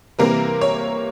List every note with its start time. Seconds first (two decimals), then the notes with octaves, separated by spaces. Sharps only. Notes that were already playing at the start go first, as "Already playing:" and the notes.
0.19 C3 E3 G3 A#3 A#4
0.61 C#5